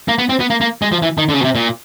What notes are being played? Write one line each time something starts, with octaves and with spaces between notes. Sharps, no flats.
A#3
B3
C4
B3
A#3
A#3
G#3
F3
E3
D#3
D3
C#3
B2
C3
A#2